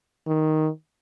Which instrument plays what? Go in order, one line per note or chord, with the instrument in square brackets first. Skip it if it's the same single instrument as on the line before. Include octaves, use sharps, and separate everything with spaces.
[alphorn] D#3